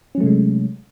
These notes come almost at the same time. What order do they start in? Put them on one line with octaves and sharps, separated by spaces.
C#4 F#3 A3 C3 G#3